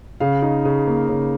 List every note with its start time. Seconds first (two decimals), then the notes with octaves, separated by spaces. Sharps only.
0.20 C#3 F5
0.42 D#4
0.65 C#3
0.87 A#3
1.09 C#3